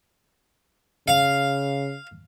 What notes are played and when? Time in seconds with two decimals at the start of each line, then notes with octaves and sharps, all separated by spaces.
1.08 C#3 F5